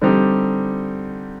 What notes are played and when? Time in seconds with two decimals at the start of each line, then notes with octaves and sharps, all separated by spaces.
0.01 D3 G3 C4 D#4 G4